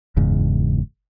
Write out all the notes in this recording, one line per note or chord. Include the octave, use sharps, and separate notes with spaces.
F#1 E2 G#2 C#3